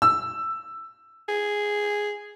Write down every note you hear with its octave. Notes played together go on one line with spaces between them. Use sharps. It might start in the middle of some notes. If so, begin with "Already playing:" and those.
E6
G#4